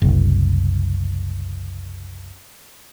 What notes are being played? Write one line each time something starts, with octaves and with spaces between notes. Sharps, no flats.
F#1 C2